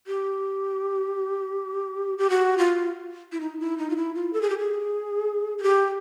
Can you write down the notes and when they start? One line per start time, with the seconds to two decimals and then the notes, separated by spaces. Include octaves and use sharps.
0.07 G4
2.18 G4
2.30 F#4
2.58 F4
3.32 E4
3.41 D#4
3.60 E4
3.78 D#4
3.90 F4
3.96 E4
4.15 F4
4.33 A4
4.42 G#4
4.50 G4
4.58 G#4
5.58 G#4
5.63 G4